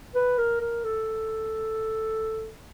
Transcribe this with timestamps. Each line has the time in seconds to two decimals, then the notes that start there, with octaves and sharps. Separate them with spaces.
0.15 B4
0.38 A#4
0.61 A#4
0.84 A4